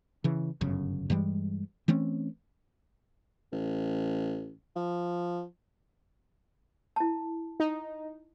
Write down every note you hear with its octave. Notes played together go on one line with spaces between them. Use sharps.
C#3 E3
G1 F#2 C#3
G2 E3 G3 G#3
E3 A3 C4 C#4
A1
F3
E4 A5
D#4